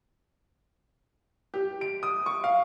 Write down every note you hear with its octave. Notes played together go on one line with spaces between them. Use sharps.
G4
D7
D#6
C#6
F5